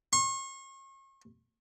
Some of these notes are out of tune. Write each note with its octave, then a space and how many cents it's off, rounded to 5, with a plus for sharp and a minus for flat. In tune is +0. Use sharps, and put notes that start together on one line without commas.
C#6 -40